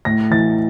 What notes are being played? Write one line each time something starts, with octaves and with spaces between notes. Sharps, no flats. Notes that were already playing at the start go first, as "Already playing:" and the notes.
A2 A#6
E3 A6